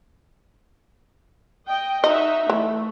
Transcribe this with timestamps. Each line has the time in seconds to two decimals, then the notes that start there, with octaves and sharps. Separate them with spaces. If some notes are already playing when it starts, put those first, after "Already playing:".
1.68 D#5 G5
2.04 D#4 F#4 D#5 E5
2.50 E3 A3